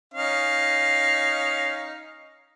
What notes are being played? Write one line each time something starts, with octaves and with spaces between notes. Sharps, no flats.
C#4 D#4 F5